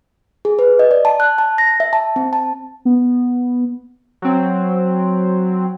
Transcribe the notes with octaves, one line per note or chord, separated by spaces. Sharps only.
G#4
B4
D#5
D5
A5
F#6
A5
A#6
E5
A5
C4
A5
B3
F#3 C4